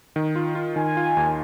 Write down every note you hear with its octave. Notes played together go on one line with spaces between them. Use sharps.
D#3
F4
F4
D#3 G#5
F4
D#2